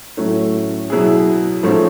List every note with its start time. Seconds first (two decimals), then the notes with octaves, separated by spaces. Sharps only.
0.17 A2 F#3 A3 C#4
0.90 B2 F#3 B3 E4 G#4
1.63 G#2 F3 A3 C#4